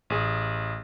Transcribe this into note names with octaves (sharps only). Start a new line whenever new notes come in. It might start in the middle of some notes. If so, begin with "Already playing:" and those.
A1 G#4